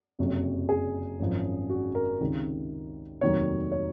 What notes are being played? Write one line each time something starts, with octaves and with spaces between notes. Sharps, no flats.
F#1 F2 C3 F#3
G#4
G#1 F#2 F3
F#4
A#4
C#2 C3 D#3
F1 D#2 D#3 F#3 C#5
C#5